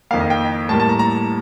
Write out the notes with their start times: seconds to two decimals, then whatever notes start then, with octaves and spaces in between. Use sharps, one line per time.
0.11 F2 D#3 A#3 F5
0.21 D#5
0.30 G5
0.69 A2 G3 A#3 A5
0.80 A5
0.89 A#5
0.99 A#5